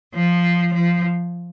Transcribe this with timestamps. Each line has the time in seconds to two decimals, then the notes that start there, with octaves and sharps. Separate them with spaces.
0.14 F3
0.73 F3